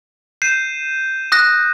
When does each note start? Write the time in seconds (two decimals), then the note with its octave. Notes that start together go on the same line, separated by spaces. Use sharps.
0.42 G6 C7 D#7 E7
1.32 D#6 F#6 A#6